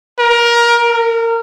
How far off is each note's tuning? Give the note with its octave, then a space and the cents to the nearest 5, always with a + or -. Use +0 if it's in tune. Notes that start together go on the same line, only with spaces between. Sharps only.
A#4 +20
A#4 -25